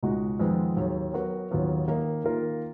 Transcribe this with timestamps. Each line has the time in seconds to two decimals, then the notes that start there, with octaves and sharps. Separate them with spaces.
0.02 C#2 B2 G#3 D#4 F#4
0.39 F2 D#3 G#3 B3 F4
0.77 D#2 D#3 F#3
1.14 F#3 B3 F#4 A#4
1.51 D#2 D#3 F#3 B3 F4
1.88 D#3 A#3 D#4
2.24 D#3 A#3 F4 A#4